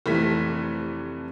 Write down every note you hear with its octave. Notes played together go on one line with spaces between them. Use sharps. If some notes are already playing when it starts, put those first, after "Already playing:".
F1 C3 E3 A3 B6